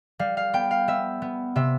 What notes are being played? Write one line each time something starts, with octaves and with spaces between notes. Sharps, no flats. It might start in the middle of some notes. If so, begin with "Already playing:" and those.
G3 F5
F5
B3 G5
F5
B3 E5
B3
C3 E5